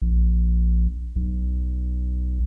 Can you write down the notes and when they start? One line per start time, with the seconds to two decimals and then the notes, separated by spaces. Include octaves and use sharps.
0.02 A#1
1.16 B1